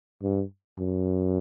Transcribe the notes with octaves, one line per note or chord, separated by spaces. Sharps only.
G2
F#2